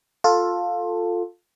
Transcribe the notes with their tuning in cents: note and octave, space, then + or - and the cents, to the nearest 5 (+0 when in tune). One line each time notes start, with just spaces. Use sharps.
F4 +15 A4 +10